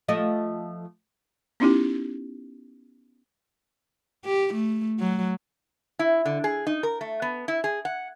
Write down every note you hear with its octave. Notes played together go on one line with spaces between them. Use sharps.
F3 A3 D#5
B3 C#4 D#4 E4 G4
G4
A3
F#3
E4
D3
G#4
D#4
A#4
A3
B3
E4
G#4
F#5